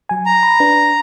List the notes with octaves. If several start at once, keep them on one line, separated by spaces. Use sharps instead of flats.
F#3 G#5
A#5
B5
D4 B4